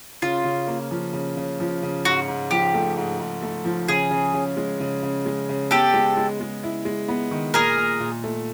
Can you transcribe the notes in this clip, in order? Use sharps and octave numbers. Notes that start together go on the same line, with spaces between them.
C#3 F4
C#3
A#3
F3
C#3
C#3
F3
C#3
G#2 F#4
G#2
F3 G4
A3
G#2
G#2
A3
F3
C#3 G#4
C#3
C#3
G#3
C#3
C#3
G#3
C#3
B3 G4 A4
G#3
G#3
G#3
E4
G#3
B3
D#3
A#2 G#4 A#4
A#2
A#2
A3